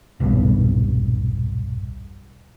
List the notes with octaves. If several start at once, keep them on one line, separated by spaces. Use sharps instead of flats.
D#1 B1 G2